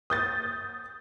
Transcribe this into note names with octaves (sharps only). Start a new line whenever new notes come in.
D#6 G6 A6